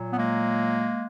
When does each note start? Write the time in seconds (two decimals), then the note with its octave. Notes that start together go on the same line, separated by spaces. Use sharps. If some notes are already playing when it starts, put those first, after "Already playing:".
Already playing: A#2 F#3
0.13 B3
0.18 G#3 A#3